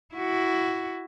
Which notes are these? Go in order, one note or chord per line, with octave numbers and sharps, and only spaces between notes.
E4 F#4